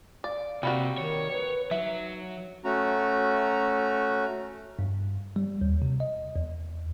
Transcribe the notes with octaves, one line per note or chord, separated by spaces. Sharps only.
D5 F5
C3 G3 A#3 F#4
D#3 C#5
B4
F#3 D#4 E5
A3 C#4 F#4 A#5
G2
G3
D#2
C3
D#5
E2